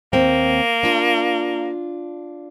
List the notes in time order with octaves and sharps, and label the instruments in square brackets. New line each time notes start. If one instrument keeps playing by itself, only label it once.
[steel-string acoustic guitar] D#2 C4 [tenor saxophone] A#3
[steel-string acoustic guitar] D4 F4